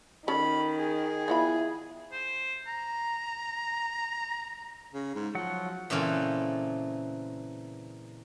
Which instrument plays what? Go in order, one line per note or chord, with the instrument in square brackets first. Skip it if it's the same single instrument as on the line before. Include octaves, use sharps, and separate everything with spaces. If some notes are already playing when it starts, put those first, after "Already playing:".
[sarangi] D#3 [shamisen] C#4 A4 [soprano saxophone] B5
[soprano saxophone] G#4
[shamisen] F3 B3 B5 [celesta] E4 E5
[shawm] C5
A#5
[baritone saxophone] C#3
G#2
[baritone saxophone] F3 [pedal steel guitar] F#3 F#5
[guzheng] A#2 C#3 E3 A3 C4